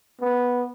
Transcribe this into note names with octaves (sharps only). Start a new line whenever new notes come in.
B3